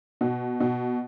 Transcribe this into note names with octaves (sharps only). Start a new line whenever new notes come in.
B2
B2